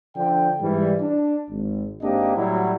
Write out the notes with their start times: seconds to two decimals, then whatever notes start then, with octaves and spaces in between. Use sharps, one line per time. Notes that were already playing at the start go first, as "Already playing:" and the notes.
0.16 D3 F3 D4 G5
0.60 G#2 E3 G3
1.00 D4
1.50 G#1
2.01 G#1 A#3 C4 D4 G4 D#5
2.36 A2 F#3 G3 E4 F#4 F#5